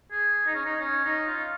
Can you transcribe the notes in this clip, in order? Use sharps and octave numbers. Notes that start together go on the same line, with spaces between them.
G#4
D#4
C#4
D#4
C#4
D#4
F4